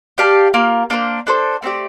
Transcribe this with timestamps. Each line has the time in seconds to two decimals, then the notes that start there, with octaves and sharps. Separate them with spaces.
0.18 G4 D5 F5 A5
0.54 A#3 F4 A#4
0.90 A#3 D4 A4 C5
1.27 D4 A4 C5
1.62 A3 C4 G4 D5